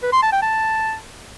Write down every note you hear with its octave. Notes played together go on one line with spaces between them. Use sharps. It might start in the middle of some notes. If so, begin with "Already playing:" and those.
B4
C6
A5
G5
A5